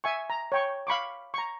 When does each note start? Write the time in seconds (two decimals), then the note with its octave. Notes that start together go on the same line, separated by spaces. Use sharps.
0.04 E5 G#5 C#6
0.30 A#5
0.52 C#5 G5 C#6
0.87 F5 B5 C#6 D6
1.34 A#5 C#6